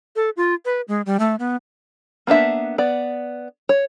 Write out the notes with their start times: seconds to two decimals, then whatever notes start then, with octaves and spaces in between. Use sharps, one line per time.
0.16 A4
0.37 F4
0.65 B4
0.88 G#3
1.06 G3
1.19 A3
1.39 B3
2.27 A#3 B3 D4 E5
2.78 B3 D5
3.69 C#5